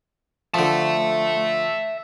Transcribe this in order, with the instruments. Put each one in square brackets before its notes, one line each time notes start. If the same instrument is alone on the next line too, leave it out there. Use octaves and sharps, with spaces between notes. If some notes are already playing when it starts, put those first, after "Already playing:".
[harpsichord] D3 F3 [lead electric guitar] E5 A5